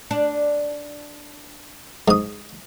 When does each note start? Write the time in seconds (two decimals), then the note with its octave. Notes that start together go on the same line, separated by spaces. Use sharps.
0.11 D4
2.08 G#2 D#6